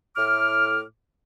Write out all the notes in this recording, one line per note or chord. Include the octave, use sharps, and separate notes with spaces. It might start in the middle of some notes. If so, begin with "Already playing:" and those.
A2 D6 F6